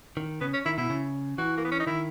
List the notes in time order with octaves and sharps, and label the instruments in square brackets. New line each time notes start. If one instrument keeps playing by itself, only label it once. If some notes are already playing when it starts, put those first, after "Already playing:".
[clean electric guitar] D#3
[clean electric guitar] C#3 [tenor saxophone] B3
[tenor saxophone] C#4
[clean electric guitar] D#3 [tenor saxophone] E4
[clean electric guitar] B2 [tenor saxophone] E4
[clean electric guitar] C#3
[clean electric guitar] E3 [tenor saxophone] F#4
[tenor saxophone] A#3
B3
C#4
D#4
[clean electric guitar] D#3 [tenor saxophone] E4